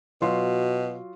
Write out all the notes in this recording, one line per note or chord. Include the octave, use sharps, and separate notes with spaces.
B2 F#3 F4 C6